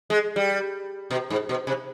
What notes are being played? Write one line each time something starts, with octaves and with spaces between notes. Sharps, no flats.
G#3
G3
B2
G#2
B2
C3